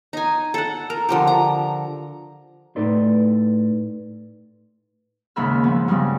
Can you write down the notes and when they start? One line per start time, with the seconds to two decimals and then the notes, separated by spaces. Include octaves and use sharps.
0.13 D#4 G#5
0.54 A4 F#5
0.90 A#4
1.09 D3 F3 G4
1.27 A#5
2.76 A2 D#4 A4 B4 D5 C6
5.36 D#2 G#2 C#3 E5 B5 F6
5.64 F3 B3
5.88 G2 C#3 G3 G#3